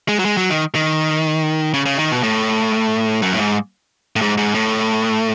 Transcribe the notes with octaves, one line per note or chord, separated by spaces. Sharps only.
G#3
F#3
G#3
F#3
D#3
D#3
C#3
C#3
D#3
B2
A2
F#2
A2
G#2
A2
G#2
G#2
A2